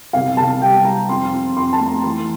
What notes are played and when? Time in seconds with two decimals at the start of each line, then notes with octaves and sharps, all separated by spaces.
0.13 C2 F5
0.37 C2 A5
0.62 G3 G5
0.85 C4 A#5
1.09 F2 C6
1.33 F2
1.57 F2 C6
1.73 A5
1.80 A3
1.88 A#5
2.04 E3 C6